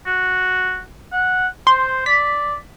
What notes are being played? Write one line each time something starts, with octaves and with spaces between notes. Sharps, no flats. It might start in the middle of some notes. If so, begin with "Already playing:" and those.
F#4
F#5
C5 C6
D5 B6